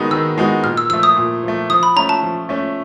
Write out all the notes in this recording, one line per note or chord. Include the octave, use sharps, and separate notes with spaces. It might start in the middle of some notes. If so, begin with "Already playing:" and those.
Already playing: D#3 G#3 B3 D#4 F#4
D#3 E6
G#3 B3 D#4 F#4
A#2 F6
E6
F3 A3 E6
D#6
A#2
F3 A3
F3 D#6
B5
A3 C#4 A#5
A5
F3
A3 C#4